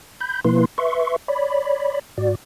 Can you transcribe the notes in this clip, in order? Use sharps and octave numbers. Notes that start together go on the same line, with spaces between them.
B5 G6
B2 F3 A#3 E4 B4 C6
B4 E5 C6 C#6
C#5 D5 B5
G#2 F#4 D5